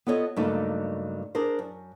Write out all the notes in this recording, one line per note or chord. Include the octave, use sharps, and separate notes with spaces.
B3 F4 A4 C#5 D#5
G2 C#3 F#3 A3 A#3 D#4
D4 G#4 A#4 C5
F#2